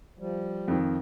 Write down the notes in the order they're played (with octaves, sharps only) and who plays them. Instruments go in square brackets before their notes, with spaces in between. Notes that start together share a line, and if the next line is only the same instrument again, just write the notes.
[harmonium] F3 G3
[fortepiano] F2 D#3